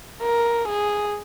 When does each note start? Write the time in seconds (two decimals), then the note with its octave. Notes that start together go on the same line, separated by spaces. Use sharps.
0.22 A#4
0.69 G#4